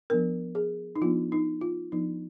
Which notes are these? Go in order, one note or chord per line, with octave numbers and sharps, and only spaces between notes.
F3 B3 D4 A#4
G#4
D#4
F3 B3 D4 F4
D#4
F4
F3 B3 D4 D#4